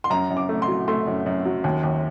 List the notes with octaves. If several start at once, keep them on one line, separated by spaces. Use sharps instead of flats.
C6
F#2 A#5
F#2
D6
A3
C6
F#3
A3 C6
F#2
F#2
F#3
D#2
D#2